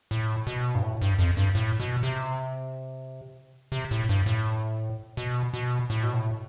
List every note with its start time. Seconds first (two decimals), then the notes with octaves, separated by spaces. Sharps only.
0.11 A2
0.47 B2
0.75 G2
0.82 A2
1.02 G2
1.18 F2
1.37 G2
1.55 A2
1.80 B2
2.03 C3
3.72 C3
3.91 A2
4.09 G2
4.26 A2
5.17 B2
5.54 B2
5.90 A2
6.03 B2
6.14 A2